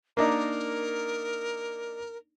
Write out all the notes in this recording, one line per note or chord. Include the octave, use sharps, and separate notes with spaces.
A#3 D4 D#4 A#4